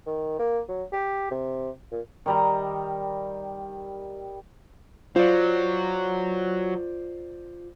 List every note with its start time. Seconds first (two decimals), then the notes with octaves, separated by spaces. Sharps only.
0.06 D#3
0.39 A#3
0.69 F#3
0.93 G4
1.31 C3
1.91 A#2
2.26 D#3 G3 A#5
5.16 F#3 F4 C5 D5